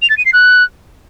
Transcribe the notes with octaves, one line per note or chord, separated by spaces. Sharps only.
F7
A6
D#7
C7
F#6